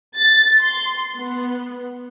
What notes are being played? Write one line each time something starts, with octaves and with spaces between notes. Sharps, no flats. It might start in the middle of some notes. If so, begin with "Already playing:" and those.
A6
C6
B3